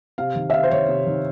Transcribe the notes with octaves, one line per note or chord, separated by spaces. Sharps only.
C3 F5
D#3
E5
C3 F5
C5
D#3 C#5
C3
D#3